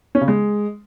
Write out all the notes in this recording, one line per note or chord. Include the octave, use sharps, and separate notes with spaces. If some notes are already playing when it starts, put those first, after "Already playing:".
C#4
C#3
G#3